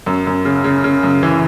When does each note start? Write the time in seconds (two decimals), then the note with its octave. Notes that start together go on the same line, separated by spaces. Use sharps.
0.06 F#2
0.27 F#2
0.45 C#3
0.64 C#3
0.84 C#3
1.03 F#2
1.23 E3